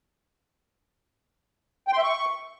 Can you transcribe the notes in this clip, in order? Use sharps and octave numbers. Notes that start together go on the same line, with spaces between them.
G5
C6
E5
C#6